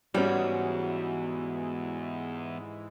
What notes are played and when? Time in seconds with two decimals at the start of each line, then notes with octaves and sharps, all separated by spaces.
0.14 E2 G#2 E3 G3 C#4 F#4